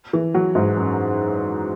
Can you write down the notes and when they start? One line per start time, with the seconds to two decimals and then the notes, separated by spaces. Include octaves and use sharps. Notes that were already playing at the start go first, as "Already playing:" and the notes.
0.13 E3
0.34 F#3
0.55 G#2
0.77 F#2